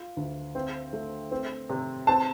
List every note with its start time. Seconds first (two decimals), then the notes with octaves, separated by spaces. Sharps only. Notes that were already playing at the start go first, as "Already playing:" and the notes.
Already playing: F4
0.17 D2
0.55 C4
0.93 A3
1.32 C4
1.70 C3
2.07 C4 A5